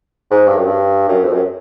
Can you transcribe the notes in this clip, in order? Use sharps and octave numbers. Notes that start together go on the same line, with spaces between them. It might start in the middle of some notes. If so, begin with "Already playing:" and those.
G#2
G2
F#2
G2
F#2
F2
F#2